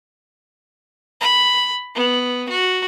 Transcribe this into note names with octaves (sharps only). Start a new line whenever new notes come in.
B5
B3
F#4